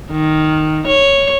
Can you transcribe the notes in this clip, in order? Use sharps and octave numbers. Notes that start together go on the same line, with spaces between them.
D#3
C#5